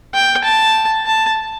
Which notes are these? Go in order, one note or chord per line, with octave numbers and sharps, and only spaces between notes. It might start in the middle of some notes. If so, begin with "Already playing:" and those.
G5
A5
A5